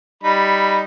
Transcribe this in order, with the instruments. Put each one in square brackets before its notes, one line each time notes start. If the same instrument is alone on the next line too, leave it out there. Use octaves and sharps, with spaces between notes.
[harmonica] G3 D#4 B5